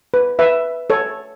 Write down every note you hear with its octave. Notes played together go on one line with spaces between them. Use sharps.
B4
B4 E5
A4 C#5